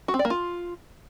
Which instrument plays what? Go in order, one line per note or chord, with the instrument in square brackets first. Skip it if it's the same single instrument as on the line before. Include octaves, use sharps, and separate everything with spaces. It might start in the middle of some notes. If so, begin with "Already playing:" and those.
[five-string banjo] F#4
C4
D5
A#3
F4